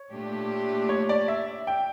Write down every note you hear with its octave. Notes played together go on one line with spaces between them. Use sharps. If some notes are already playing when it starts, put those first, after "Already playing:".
Already playing: C#5
A#2 A3 D4 G4
C#5
D5
E5
G5